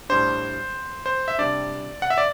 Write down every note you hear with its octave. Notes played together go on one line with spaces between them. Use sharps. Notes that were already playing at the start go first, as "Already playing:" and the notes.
A2 G3 D4 C5
C5
E5
C3 G3 D4 D5
F#5
E5
D5